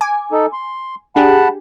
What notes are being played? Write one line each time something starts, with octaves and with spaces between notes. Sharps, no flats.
G#5 D6
D#4 A4
C6
D4 G4 G#4 F#5 A5 B5